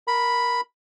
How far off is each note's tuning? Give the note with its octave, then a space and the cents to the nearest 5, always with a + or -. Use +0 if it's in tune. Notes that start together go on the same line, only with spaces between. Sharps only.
A#4 +10 B5 +0